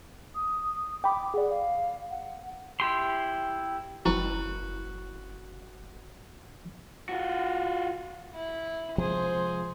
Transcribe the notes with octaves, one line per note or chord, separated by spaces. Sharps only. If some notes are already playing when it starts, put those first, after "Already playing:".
D#6
G5 B5 D6
G#4 D5 F#5
F5
F#5
E4 G4 C6
F#1 E4 F#4 B4
F4 F#4
E4
C3 F3 G#3 G#4 C5